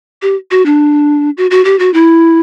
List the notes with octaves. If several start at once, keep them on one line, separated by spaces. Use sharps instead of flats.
G4
F#4
D4
F#4
F#4
G4
F#4
E4